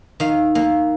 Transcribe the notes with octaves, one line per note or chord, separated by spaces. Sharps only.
D#3 F5
A#3